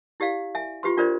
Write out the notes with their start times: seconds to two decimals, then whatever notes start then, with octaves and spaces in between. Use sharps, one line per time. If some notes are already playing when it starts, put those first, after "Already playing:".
0.20 E4 G4 D5 F5
0.55 E5 G#5
0.83 F4 G4 B4 C6
0.97 D4 F4 A#4 C5 D5